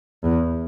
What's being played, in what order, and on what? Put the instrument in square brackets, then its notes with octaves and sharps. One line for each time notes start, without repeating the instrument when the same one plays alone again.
[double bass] E2